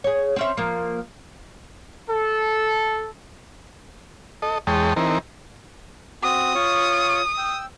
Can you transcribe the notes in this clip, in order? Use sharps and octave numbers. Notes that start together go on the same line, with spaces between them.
G#4 C#5
C4 C#4 E5
F3 A#3
A4
A4 D#5
E2 G#3 C#5 G5 A5 D#6
E3 C4 D#4 A#4
C4 F#4 D#6
F4 C#5 C#6
G5 E6